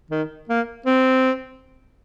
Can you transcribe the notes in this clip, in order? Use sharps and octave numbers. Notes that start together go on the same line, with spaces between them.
D#3
A#3
C4